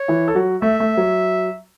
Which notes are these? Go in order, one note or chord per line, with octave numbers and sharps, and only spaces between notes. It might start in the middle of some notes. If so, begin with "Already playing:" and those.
Already playing: C#5
E3 E4
A4
F#3 F#4
A3 E5
A3
F#3